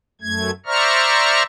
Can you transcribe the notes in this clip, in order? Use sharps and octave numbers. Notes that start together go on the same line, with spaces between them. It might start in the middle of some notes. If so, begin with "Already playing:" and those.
F#2 A3 G#6
C5 D5 E5 A#5 C#6 F6